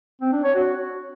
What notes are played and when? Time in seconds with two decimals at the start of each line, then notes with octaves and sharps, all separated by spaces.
0.21 C4
0.32 D4
0.44 C#5
0.55 F#4